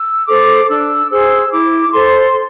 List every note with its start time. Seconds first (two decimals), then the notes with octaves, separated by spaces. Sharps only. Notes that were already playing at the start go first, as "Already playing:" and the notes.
Already playing: E6
0.27 A4 C5 D6
0.69 D4 E6
1.10 G#4 C5 E6
1.52 E4 D6
1.93 A4 C5 C6